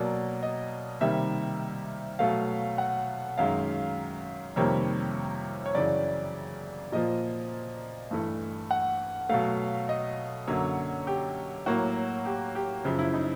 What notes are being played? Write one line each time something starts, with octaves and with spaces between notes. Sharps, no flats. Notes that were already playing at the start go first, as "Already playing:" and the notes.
Already playing: B2 F#3 A#3 D5
D#5
C3 D#3 G3 A#3 E5
B2 F#3 A3 F5
F#5
F#2 D#3 G#3 F5
F2 C3 D#3 G3 A#3 C#5
C#5
F#2 C#3 E3 D5
A#2 F3 A#3 D#5
G2 E3 A3
F#5
B2 F#3 A3 F5
D#5
F#2 D3 F#3 A#3 C#5
G4
A2 F#3 A#3 F#4
G4
G4
F#2 C#3 F3
E4
D#4